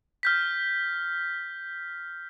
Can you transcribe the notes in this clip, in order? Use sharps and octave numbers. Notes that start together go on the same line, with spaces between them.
F6 G6 B6